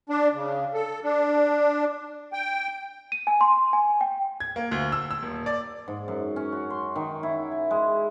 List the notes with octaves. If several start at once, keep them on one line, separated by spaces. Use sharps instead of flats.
D4
C#3
A4
D4
G5
D#7
G#5
C6
G#5
G5
G#6
A#3
D2
E6
E6
D#1
D5
G#2
F#2
C#4
F#4
C6
D#3
E4
G#5
G#3